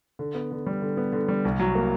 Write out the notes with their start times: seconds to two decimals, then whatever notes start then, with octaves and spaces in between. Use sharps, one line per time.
0.19 D3
0.35 B3
0.51 D3
0.66 G3
0.82 D3
0.97 B3
1.12 D3
1.28 G3
1.45 C2
1.60 F#3
1.75 A#3